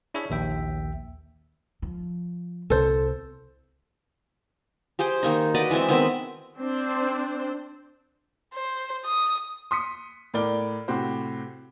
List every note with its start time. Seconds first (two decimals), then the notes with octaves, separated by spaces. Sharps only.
0.14 D4 E4 G#4 C#5 E5
0.30 A#1 D#2 E5 G5
1.82 F3
2.70 C2 A4 C5
4.99 G4 G#4 C5 G5
5.23 D#3 A#3 D#4
5.54 F#4 B4 D5 D#5
5.71 E3 G#3 C4 E5
5.88 D#3 B3 C4 E5
6.58 C4 D4 C5
8.54 C5
9.05 D#6
9.71 C6 D#6 B6 C#7
10.34 A2 A#4 D5 G7
10.88 A2 C3 F#4 G4 C5